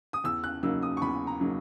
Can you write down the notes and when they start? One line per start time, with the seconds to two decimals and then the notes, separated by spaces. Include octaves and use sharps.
0.13 D#6
0.24 E2 E6
0.44 F#6
0.63 C#3 F#3 A#3 D#4 E6
0.82 D#6
0.97 C#6
1.02 E2 B5
1.27 A#5
1.40 C#3 F#3 A#3 D#4